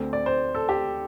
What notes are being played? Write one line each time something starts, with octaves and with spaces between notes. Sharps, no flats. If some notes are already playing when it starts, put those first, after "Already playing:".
Already playing: D2 D3 A3 C4
D5
C5
A4
G4